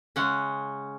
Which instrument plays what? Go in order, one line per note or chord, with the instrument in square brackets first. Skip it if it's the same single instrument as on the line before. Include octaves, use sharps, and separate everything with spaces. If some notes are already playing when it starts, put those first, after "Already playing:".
[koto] C#3 G#3 C#4 F#5